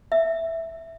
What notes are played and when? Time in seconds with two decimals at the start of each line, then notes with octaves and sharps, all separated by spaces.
0.12 E5